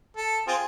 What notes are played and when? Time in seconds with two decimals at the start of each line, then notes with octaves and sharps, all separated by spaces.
0.17 A4
0.48 C4 F4 G#4